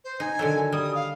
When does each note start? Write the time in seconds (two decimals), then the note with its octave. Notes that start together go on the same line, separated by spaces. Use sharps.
0.04 C5
0.20 D#4 G#5
0.39 D3 D#3 F#3
0.72 G3 D#6
0.94 F5